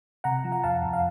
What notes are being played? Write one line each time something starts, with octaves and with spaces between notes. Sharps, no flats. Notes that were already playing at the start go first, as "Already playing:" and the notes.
C3 F#5 A#5
F3
F#5
F2 F5 A5
F2
F5